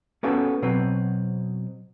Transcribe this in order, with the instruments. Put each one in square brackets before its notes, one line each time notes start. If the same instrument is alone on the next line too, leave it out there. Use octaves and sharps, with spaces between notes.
[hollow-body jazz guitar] A#3 B3 C#4 F#4 G4 A4
B2 F#3 C4 B4